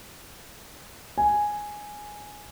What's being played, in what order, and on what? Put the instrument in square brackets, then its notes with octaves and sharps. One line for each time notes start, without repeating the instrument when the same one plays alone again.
[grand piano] G#5